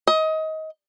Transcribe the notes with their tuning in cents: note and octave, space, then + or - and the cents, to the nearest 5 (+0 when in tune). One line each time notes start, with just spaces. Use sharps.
D#5 +25